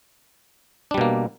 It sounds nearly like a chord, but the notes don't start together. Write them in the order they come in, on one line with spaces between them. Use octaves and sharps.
D4 G3 B2 A#3